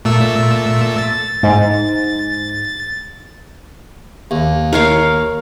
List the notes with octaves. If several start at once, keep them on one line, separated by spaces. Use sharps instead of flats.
A#2 A3 E6
A6
G#2
D#2
A#4 C#5 F5